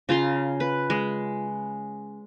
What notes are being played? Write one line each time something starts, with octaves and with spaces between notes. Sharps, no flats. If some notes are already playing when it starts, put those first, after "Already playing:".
C#3 F4 A#5 C6
B4
G#3